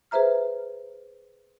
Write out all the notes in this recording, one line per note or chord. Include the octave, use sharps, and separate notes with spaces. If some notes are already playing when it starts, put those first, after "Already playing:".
G#4 B4 C5 E5 A#5 F6